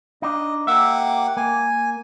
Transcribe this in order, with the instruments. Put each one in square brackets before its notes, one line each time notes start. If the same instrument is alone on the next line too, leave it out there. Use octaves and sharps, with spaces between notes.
[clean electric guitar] D4 D#4 [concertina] D#5
[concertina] A#3 F#5 D6 [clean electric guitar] G4 E5
[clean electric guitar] A#3 [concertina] G#5